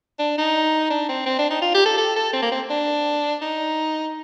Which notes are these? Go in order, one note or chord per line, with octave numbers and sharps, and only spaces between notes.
D4
D#4
D4
C4
C4
D4
D#4
F4
G4
A4
A4
A4
C4
A#3
C4
D4
D#4